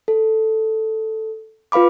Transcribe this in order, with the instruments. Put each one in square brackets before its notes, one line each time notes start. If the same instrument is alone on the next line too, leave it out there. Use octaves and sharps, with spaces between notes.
[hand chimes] A4
F4 B4 F5 B5 D6